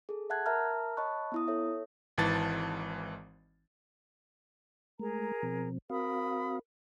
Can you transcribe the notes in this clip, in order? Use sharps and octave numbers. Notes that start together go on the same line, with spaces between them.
G#4 A4
E5 F#5 A5 F#6 G#6
A#4 E5 A5 A#5 F6
C#5 D#5 A5 B5 C#6 F#6
B3 E4 D#6
A4 C#5 E5
G#1 G#2 E3 A5 A6
G#3 A3 G#4 A#4 A#5
B2 F3 C4
C4 F#4 A#4 F5 B5 D#6